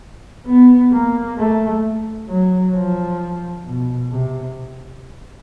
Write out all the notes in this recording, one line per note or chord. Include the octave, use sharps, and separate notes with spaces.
B3
A#3
A3
F#3
F3
B2
C3